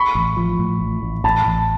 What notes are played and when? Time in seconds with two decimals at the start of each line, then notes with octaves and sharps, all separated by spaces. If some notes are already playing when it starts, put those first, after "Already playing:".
Already playing: B5 C#6
0.15 A1
0.37 F3
0.59 A2
0.80 A1
1.03 A1
1.24 A1 A5 B5
1.46 A1